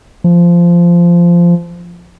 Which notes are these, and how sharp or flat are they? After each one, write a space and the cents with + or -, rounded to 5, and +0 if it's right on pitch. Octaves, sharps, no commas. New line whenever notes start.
F3 -15